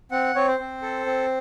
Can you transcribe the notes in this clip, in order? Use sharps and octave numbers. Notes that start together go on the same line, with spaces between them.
C4 F#5
C4 C#5
C5
C4
A4
C4